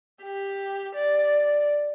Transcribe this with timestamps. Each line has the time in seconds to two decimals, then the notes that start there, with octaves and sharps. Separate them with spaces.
0.22 G4
0.95 D5